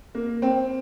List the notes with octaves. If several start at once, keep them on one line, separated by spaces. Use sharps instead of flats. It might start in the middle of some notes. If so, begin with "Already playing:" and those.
A#3
C4